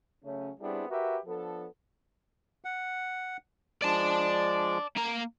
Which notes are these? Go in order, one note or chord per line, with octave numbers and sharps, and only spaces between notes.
C#3 F#3 A3 C#4
G3 B3 C4 D4 E4 G#4
F#4 G4 A#4 B4 E5
F3 B3 D4 A4
F#5
F3 G#3 D5 A5
A#3 A#5